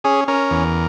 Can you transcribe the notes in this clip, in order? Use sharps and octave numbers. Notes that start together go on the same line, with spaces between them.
C#4 G#4
C#4 A#4
E2